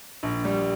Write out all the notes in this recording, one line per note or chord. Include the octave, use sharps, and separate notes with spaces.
A#1
G3